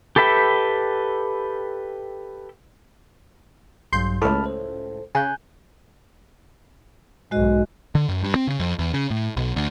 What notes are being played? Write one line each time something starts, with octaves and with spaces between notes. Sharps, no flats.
G4 A4 B4 E5 G5
A#1 G2 F#3 C6 G6
C#2 A2 A5 B5 F6
A4 C5
C#3 G#5 F#6 G6
B1 G#2 G#3 F#4 D#5
D3
F#2
G2
C4
C#3
F2
E2
C#3
A2
B1
D2